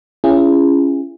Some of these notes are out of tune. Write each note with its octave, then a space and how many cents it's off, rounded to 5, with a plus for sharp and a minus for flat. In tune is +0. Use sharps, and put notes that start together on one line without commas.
C#4 +0 E4 +40 G#4 -20